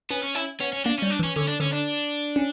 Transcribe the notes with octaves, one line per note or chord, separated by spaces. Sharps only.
B3 C#4
C#4
C#4 E4
B3 C#4
C#4
A#3 D4
G3 C#4
D4
E3
C#4
D3 C#4
D4
D3 C#4
D4
C#4